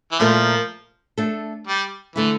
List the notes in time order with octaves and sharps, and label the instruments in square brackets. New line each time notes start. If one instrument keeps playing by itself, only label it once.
[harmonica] E3
[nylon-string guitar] A#2 A3 E4 A#4 [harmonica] F3
[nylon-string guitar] A3 D4 A4
[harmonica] G3
[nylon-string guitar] D3 A3 E4 [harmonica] E3